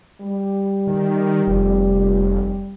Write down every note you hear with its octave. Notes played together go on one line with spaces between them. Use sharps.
G3
D#3
F1